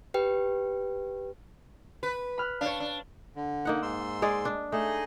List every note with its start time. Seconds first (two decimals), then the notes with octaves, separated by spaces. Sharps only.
0.14 G4 B4 G5
2.03 B4
2.38 B5 F6 F#6
2.61 D4 C#5 F5
2.80 D4
3.36 D3
3.65 A#3 D#4 F#5
3.82 G#2 C6 E6
4.22 G#3 G#4 D5
4.45 D4
4.72 A3 D#4 G#4 D#5